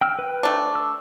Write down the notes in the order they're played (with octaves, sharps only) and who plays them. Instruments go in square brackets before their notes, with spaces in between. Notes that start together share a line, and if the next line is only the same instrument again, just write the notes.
[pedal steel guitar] G5 E6 F6
B4 G5
[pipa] A3 D4
[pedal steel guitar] E6